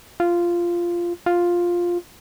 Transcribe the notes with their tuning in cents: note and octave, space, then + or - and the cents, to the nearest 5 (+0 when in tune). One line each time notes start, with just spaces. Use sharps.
F4 -10
F4 +5